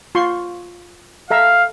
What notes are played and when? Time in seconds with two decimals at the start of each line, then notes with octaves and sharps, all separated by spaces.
0.15 F4 C6 C#6
1.30 A4 E5 F5 A#5